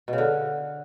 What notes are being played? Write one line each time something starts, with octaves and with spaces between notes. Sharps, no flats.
B2
C#3
D3